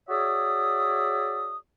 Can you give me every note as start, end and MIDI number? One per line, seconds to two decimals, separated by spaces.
0.09 1.56 66
0.09 1.56 68
0.09 1.56 73
0.09 1.56 74
0.09 1.56 76
0.09 1.56 87